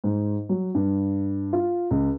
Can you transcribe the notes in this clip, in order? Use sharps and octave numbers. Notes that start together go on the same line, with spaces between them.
G#2
F#3
G2
F4
C#2